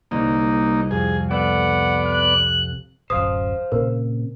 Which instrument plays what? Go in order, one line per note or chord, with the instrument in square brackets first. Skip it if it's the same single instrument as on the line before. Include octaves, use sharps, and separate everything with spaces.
[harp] C2 [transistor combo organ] A#3 D#4
[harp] F2 [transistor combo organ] G#4
[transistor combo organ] B3 D5 [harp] A4 [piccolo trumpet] F#5
[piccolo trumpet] F#6
[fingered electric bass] D1 F#2 [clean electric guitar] C5 F5 [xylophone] D#6
[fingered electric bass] A#2 C#3 C4 [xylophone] A#4